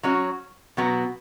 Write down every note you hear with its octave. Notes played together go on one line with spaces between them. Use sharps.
F#3 C#4 F#4 C#5
B2 F#3 B3 F#4